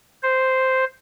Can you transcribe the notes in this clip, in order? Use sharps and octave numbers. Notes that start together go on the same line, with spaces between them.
C5